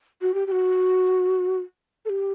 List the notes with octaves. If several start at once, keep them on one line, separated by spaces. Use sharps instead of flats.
F#4
G4
G4
F#4
A4
G4